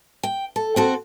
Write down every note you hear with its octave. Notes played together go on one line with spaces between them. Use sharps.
G5
A4
C4 F#4 A4